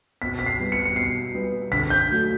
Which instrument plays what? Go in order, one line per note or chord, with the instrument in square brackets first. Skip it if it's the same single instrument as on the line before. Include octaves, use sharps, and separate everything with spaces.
[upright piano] B2 [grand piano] B6
[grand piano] B6
C7
[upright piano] G3 B3
[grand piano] C#7
C#7
[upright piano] B2 [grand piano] C7
[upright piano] G3 B3
[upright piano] D3 [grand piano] B6
[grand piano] G6
[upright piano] F#3 A3 D4